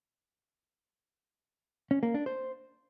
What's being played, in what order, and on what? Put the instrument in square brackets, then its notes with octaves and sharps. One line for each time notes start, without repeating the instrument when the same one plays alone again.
[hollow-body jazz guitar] C#4
A#3
D4
C5